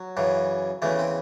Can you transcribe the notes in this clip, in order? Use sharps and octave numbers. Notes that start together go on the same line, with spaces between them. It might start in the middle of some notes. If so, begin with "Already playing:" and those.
Already playing: F#3
F#2 C#3 E3
E2 C#3 E3 A3
C4